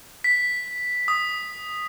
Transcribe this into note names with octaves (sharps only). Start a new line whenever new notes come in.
B6
D#6